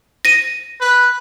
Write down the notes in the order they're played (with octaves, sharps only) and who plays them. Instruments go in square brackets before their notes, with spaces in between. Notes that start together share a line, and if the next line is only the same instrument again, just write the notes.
[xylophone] A#6 D#7
[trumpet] B4